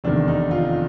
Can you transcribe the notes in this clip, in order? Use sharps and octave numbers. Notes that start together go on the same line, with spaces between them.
F1 E2 C3 D#3 D4
D#4
F4